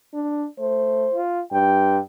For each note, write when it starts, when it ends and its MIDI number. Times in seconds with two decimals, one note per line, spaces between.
0.14 0.46 62
0.59 1.09 57
0.59 1.18 72
1.14 1.44 65
1.52 1.98 43
1.52 2.01 79